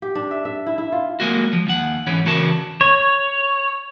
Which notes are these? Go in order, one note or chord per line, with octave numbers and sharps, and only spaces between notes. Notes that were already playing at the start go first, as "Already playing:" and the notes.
G4
D4
E5
E5
E4
E4
F4
G#3 A#3 F#4
F3
D#2 F#5
G#2 E3 C#4
C#3 E3 F#4 A#4 A5
C#5